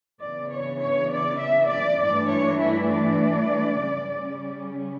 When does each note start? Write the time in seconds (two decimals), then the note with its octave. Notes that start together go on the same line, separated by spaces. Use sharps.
0.20 C#3 E3 B3 D4 D5
0.51 C#5
0.80 C#5
1.11 D5
1.40 E5
1.70 D5
2.00 G2 E3 A3 D4 D5
2.31 C#5
2.59 E4
2.90 D5
3.80 C#3 G3 C#4